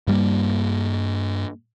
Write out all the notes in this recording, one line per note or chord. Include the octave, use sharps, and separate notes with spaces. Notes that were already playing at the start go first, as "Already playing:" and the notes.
G2 G3 A#3